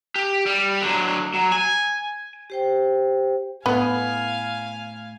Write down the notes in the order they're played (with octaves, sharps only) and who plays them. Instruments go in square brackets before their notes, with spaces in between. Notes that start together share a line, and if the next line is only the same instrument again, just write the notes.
[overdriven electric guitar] G4
G3
D3 F#3
F#3
G#5
[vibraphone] G4 C5 G5
[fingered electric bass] A2 [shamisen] B3 [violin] F5 G#5 [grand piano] B5